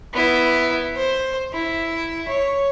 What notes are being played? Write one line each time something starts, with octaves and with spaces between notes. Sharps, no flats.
B3 E4
C5
E4
C#5